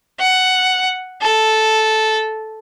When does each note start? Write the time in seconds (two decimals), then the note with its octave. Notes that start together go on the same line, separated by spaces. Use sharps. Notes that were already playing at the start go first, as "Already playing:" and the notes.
0.20 F#5
1.22 A4